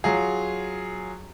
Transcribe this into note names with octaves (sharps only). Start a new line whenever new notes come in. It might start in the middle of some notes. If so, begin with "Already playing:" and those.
F#3 F4 G#4